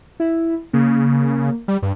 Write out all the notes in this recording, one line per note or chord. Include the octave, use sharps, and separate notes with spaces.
E4
C#3 A#3
G3
G2